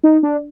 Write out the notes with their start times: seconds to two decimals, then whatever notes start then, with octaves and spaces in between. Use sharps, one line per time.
0.04 D#4
0.23 D4